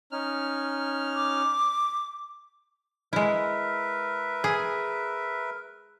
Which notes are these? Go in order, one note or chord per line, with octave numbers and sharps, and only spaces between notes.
C#4 D#4 F6
D6
G#3 E4 A#4 B4 E5
G#4